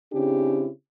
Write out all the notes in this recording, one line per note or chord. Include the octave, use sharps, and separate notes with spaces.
C#3 C4 D4 E4 G4 G#4